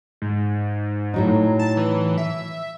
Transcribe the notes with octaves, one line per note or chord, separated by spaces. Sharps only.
G#2
A2 F#3 D#4
A5
E3
E5